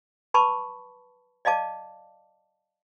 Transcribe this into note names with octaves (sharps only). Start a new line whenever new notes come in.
B4 A5 B5 C#6 D6
D5 D#5 F5 A5 D6